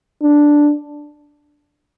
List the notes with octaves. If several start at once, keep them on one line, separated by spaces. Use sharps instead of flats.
D4